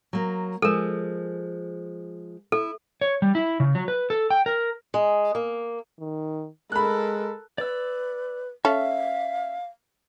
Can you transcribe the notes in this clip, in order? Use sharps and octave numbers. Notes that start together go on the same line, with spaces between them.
F#3 A#3
F3 G#3 A4 A#4
E4 A4
C#5
G3
E4
C#3
F#3
B4
A4
G5
A#4
G#3
A#3
D#3
G#3 A4 A#4 B5 F#6
B4 D5 E6
C#4 A4 E5 F5